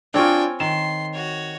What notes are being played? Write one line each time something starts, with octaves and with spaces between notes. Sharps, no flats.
C4 D4 F4 C#5 G5 G#5
D#3 C6 E7
F#4 C#5